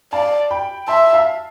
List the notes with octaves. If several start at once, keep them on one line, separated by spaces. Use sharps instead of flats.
D5 F5 A5
G5 B5
E5 A5 C6
F5 A5